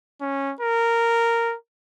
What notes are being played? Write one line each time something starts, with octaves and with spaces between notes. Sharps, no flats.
C#4
A#4